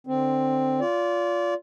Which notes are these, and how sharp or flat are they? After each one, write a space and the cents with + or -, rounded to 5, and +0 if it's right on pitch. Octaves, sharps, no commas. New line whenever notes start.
D3 +15 C4 +0
F4 +0 D5 -30